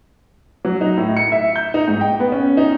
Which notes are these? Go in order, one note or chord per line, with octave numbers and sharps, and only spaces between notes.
F#3
D#4
A2
C#7
E5
G6
D#4
G#2
G5
B3
C#4
D#4